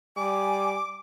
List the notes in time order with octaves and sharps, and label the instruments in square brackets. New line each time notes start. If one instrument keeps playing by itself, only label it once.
[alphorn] G3 [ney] G#5 [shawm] D6